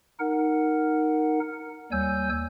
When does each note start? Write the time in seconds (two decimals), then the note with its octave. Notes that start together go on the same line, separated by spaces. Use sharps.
0.20 D#4 A#4 F#5
1.92 D#2 G3 C#5 G#5 E6 G6